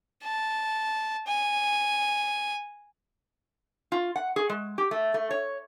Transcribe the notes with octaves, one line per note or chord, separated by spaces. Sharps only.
A5
G#5
F4
F#5
G#4
G#3
G4
A3
A3
C#5